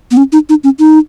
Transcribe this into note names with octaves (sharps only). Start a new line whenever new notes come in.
B3
C#4
D#4
D#4
C#4
D#4